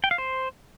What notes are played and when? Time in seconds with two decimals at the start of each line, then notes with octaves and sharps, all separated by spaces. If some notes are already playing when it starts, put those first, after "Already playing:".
0.04 G5
0.11 F5
0.18 C5